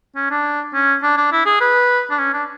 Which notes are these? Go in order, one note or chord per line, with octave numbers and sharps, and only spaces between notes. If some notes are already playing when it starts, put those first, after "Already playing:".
C#4
D4
C#4
D4
D4
E4
G#4
B4
D4
C#4
D4